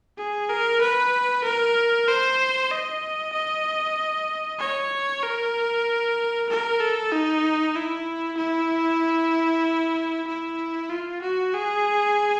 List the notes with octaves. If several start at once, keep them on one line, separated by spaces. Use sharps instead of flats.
G#4
A#4
B4
A#4
C5
D#5
D#5
C#5
A#4
A#4
A4
D#4
E4
E4
E4
F4
F#4
G#4